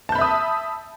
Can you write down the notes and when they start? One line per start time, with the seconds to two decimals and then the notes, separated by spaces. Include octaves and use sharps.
0.09 A5
0.12 G6
0.15 B5
0.18 E5
0.21 D#6